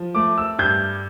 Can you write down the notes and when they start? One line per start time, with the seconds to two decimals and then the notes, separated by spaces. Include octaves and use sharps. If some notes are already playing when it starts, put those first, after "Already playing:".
Already playing: F3
0.15 A3 D6
0.38 E6
0.59 G2 G6